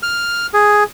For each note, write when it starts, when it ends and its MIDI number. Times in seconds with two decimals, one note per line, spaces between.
0.03 0.47 89
0.54 0.84 68